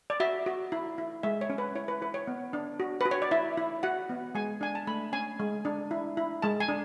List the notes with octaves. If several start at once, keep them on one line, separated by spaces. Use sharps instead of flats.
D5
F#4 E5
F#4
E4
E4
G#3 E5
C#5
C#4
B4
E4 C#5
B4
E4 B4
C#5
B3
D4
F#4
F#4 B4
C#5
D5
E4 E5
E4
F#4 F#5
B3
G#3 G#5
D4 G#5
A5
A3 B5
C#4 G#5
G#3
D4
E4
E4
G#3 A5
G#5
D4